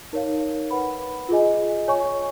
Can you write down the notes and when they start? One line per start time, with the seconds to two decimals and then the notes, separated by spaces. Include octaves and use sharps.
0.13 D#4 A#4 C#5 F5
0.71 B4 F#5 B5
1.29 F4 G#4 D#5 G#5
1.88 C#5 G#5 C#6